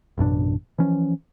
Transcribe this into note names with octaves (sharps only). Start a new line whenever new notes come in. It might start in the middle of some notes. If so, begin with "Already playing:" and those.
A1 F#2 B2 D4
E3 F3 C#4